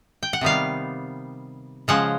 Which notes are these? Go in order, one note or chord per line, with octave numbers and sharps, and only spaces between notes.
G5
F#5
C3 D#3 G3 B3 D#4 F5
C#3 F3 G#3 F#5